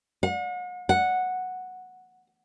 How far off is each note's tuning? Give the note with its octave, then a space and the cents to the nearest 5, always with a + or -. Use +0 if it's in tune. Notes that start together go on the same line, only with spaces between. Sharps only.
F#5 -40
F#5 -5